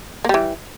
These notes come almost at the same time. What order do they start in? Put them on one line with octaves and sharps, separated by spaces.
A#3 G3 E3